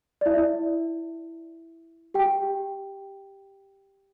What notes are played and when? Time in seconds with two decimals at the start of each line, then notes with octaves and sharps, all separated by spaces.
0.21 D5
0.26 E4 E5
2.14 G4 G5